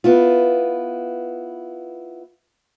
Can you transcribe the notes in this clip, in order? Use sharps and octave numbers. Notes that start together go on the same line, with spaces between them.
B3 E4 F4